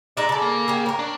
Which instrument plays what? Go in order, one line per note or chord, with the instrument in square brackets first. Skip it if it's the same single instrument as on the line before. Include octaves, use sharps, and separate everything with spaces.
[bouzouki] G#3 D#4 E5 [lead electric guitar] D5
[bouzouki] C#3 A4
[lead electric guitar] A#3
[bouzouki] C#3 G4
A#4 C#5
[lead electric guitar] D4